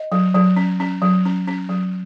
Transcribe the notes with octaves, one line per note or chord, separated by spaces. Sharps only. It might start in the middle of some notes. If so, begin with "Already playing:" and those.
Already playing: D#5
F#3
F#3
C#4
C#4
F#3
C#4
C#4
F#3